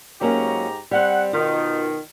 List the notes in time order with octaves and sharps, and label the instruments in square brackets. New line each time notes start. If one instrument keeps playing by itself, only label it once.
[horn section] G#2 G4 A#5 [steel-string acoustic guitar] F#3 A#3 C#4
[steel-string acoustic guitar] G3 C4 [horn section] F#5
[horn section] B2 D#3 [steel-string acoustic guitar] F4